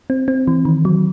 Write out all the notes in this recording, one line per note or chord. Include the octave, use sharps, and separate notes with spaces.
C4
C4
E3
D#3
F#3